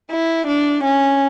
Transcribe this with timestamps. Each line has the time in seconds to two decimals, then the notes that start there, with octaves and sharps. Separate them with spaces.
0.11 E4
0.47 D4
0.84 C#4